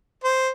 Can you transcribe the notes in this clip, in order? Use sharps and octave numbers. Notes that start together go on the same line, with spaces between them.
C5